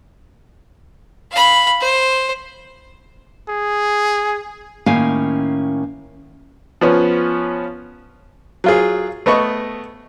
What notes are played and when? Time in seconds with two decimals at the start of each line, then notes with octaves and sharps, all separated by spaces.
1.31 F5 B5
1.81 C5
3.49 G#4
4.86 A2 D#3 A#3 C#4 F5 G#5
6.81 F3 B3 C#4
8.64 F#3 F4 G#4
9.26 A3 B3 D#5 C#6